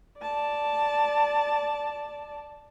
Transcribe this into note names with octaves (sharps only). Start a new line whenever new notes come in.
D5 A5